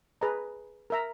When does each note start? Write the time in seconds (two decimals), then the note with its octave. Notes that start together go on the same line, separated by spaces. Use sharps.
0.21 G#4 B4 D#5 A#5
0.90 A#4 E5 A#5